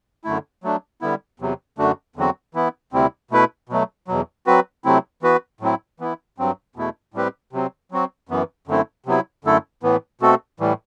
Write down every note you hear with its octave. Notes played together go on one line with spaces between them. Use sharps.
F#2 D3 A3 E4
F#3 A3 D4
D3 G3 B3 E4
E2 C3 F#3
F#2 D3 A3 D4 F#4
E2 D3 F#3 C4 F#4
E3 B3 E4
D2 C3 G3 C4 E4
B2 A3 E4 B4
B2 F#3 A3
E2 B2 F#3
F#3 C4 F#4 B4
C3 F#3 A3 C4 E4
E3 B3 F#4 B4
A2 F#3 C4 E4
E3 B3 E4
G2 F#3 C4
E2 B2 A3 E4
A2 G3 C4 G4 B4
C3 F#3 C4
F#3 C4 F#4
F#2 E3 B3
F#2 D3 A3 C4 E4
C3 F#3 B3 E4
F#2 D3 A3 E4 A4
A2 E3 B3
B2 A3 C4 F#4 A4
A2 E3 G3